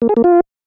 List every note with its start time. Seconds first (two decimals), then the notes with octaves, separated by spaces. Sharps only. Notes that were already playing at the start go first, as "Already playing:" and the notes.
0.02 A#3
0.09 G#4
0.17 A#3
0.24 F4